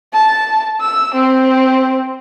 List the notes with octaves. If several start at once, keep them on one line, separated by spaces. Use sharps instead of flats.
A5
E6
C4